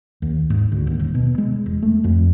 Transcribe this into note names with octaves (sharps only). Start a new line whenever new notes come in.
D#2
G#2
D2
D#2
D#1
B2
G#3
E1
A3
F2